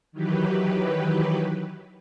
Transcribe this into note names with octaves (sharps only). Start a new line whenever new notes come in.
D#3 E3 F#3 G4 B4